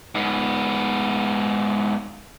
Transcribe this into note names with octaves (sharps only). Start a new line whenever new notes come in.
G#2 B3